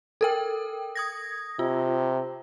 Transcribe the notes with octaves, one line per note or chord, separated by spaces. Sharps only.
A4 A#4 G5
D#6 G#6 A#6
C3 F4